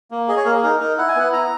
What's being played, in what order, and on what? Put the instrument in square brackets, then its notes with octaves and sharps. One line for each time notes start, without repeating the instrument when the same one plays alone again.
[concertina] A#3
G#4 D#5
C#5
A#3 A#4
G#4
D#4 A#4
D#4 A#4
E4 F#5
G#5
B3 F#5
E4 A#5